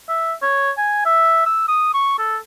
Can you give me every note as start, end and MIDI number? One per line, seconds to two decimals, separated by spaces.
0.09 0.33 76
0.42 0.71 73
0.77 1.04 80
1.06 1.46 76
1.46 1.67 88
1.68 1.92 87
1.94 2.15 85
2.19 2.37 69